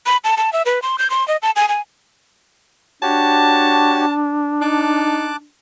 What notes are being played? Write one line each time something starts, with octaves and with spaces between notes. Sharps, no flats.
B5
A5
A5
E5
B4
C6
G6
C6
D#5
A5
G#5
G#5
D4 F#4 G4 C#5 A5
D#4 A5 D6 F#6